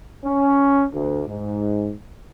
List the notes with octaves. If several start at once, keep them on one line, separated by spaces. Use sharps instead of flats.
C#4
D2
G#2